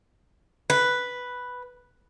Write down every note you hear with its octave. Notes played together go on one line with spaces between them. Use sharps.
B4